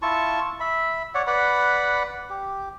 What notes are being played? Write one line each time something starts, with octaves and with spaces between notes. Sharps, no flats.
E4 F4 A5 C#6
E5 B5
C#5 D5 F#5
B4 D5 F#5 B5
G4